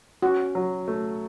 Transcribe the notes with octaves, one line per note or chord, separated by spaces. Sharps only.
C#4 F#4
F#3
A3